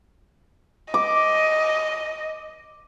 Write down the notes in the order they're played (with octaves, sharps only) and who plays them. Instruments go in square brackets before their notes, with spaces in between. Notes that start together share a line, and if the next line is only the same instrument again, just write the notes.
[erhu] D#5 [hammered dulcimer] D6